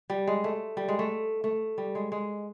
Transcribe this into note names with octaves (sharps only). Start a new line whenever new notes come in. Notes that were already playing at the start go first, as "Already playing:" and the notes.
G3
G#3
A3
G3
G#3
A3
A3
G3
G#3
G#3